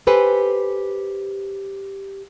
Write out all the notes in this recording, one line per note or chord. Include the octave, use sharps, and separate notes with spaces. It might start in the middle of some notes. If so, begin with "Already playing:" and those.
G4 A4 B4 C5 G#5